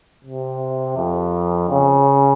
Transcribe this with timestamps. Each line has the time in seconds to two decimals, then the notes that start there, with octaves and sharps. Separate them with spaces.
0.24 C3
0.97 F2
1.70 C#3